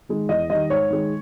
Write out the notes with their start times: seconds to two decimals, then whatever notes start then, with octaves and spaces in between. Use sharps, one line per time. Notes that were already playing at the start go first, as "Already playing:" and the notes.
0.09 D#3 G#3
0.29 E2 D#5
0.50 D#3 G3 D#5
0.70 G#2 C#5
0.90 D#3 G#3